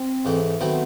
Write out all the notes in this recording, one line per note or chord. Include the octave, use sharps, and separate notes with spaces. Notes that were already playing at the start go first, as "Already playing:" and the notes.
Already playing: C4
G#2 E3 A3
D#3 F#3 A3 B3 C4